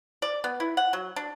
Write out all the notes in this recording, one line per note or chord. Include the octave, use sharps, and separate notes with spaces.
D5
B3
E4
F#5
F#3
D4